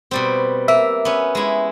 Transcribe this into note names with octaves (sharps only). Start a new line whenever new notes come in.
B2 G3 C4
A#3 E5
B3 C#4
G#3 E4